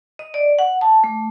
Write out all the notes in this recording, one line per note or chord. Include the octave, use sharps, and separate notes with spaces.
D#5
D5
F#5
A5
A3